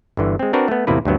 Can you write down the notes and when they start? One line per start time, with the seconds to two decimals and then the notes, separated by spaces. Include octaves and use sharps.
0.17 G1 D3 E3
0.39 G#3 C4
0.53 C4 D4 F#4 A#4 B4 D5
0.68 A3 B3
0.87 E2 A2 C3 A#3 E4 B4
1.05 D2 G2 F#3 B3